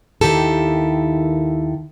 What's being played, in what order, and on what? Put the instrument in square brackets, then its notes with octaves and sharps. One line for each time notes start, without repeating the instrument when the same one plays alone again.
[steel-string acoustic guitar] D#2 D#3 E4 G4 A4